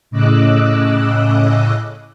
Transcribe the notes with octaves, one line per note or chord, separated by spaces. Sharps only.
A2 C#3 D#5 D6 E6 F#6